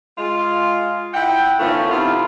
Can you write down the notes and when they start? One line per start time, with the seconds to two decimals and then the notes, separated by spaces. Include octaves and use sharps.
0.18 G#3 F4
1.14 E4 F#5 G5
1.59 D#3 F3 A3 B3 C#4
1.91 C3 E4 F4